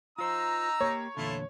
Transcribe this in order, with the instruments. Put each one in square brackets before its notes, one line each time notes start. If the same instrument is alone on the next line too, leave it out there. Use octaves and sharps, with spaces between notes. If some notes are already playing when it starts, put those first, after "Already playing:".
[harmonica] D#4 E6 [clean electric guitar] F4 C5 [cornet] A#5
[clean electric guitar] A#3 G4 [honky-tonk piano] C#5
[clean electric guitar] E2 A#2 D3 [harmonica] A3 E4 F4